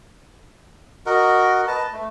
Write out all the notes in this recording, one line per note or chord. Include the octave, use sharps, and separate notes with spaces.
F#4 A#4 D#5
B4 D#5 A5
A3